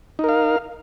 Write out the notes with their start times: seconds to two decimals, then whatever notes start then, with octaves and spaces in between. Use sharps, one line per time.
0.19 D#4
0.24 A#4
0.29 F5